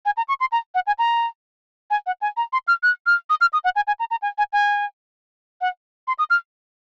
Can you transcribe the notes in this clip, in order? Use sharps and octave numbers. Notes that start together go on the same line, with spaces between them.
G#5
A#5
C#6
C6
A#5
F#5
G#5
A#5
G#5
F#5
G#5
A#5
C6
F6
F#6
F6
D#6
F6
D#6
F#5
G#5
G#5
A#5
A#5
G#5
G#5
G#5
F#5
C6
D#6
F6